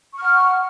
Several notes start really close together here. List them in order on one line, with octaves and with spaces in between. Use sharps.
C#6 F6 F#5